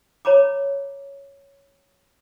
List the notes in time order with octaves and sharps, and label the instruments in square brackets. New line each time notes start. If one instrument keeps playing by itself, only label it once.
[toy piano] C#5 A#5 B5 D6